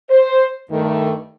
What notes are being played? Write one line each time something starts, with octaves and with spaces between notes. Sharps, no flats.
C5
G2 D#3 A3